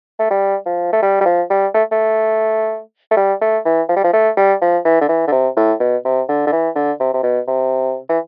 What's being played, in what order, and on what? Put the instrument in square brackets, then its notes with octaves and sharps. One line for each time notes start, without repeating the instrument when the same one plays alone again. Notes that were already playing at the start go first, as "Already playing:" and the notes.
[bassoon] A3
G3
F3
A3
G3
G3
F3
G3
A3
A3
A3
G3
A3
E3
F3
G3
F3
A3
G3
F3
E3
D3
E3
D3
C3
A2
B2
C3
D3
D3
E3
D3
C3
C3
B2
C3
E3